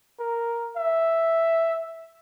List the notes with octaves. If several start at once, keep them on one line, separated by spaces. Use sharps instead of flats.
A#4
E5